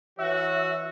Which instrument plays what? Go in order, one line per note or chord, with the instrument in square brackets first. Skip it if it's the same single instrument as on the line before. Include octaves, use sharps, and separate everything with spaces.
[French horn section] E3 C#5 [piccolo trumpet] F#4 [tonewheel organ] E5